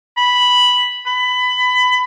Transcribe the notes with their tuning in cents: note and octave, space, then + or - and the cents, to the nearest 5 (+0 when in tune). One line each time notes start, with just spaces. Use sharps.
B5 -5
B5 +20